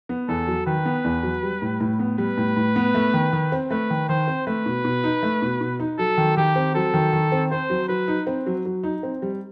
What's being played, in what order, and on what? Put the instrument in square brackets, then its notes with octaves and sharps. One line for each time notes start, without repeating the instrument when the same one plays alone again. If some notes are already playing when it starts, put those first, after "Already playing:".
[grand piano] B3
[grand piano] E2 [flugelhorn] A4
[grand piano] F#3
[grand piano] D#3 [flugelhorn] B4
[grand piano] B3
E2
F#3
G3
A2
A2
B3
[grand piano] G3 [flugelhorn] B4
[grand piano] A2
A2
B3
A3
D#3
D#3
C4
[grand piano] A3 [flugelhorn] B4
[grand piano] D#3
[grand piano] D#3 [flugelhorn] C5
[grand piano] C4
[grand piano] A3 [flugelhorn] B4
[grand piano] B2
B2
D#4
A3
B2
B2
D#4
[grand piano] F#3 [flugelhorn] A4
[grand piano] D#3
[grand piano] D#3 [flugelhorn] G4
[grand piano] C4
[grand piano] F#3 [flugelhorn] A4
[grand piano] D#3
D#3
C4
[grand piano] C4 [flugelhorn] C5
[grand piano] F#3
[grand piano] F#3 [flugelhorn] B4
[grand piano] D#4
C4
F#3
F#3
D#4
C4
G3